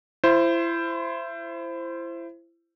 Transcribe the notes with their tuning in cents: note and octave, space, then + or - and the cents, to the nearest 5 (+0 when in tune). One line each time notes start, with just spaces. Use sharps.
E4 +30 C5 +0